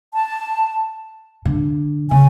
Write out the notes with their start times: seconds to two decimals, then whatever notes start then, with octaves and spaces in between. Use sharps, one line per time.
0.14 A5
1.45 D3
2.11 C#3 G#5